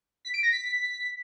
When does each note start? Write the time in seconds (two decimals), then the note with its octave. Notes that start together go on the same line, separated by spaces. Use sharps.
0.25 B6
0.34 D7
0.43 A#6
0.52 B6